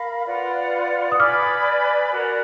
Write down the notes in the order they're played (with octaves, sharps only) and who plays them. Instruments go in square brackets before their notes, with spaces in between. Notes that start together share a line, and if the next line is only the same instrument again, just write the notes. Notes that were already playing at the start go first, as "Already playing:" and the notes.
Already playing: [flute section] A#4 F5 B5
F4 B4 D5 F#5
[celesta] D#6
[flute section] B4 D5 G#5 B5 [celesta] D6 F6
[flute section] F#4 A#4 D5